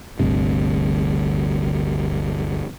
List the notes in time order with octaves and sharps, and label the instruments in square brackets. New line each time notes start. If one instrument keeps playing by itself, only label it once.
[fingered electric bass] G1 D2 G2 C3